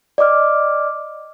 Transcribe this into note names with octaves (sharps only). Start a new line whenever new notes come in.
D5 D#5 D6 F6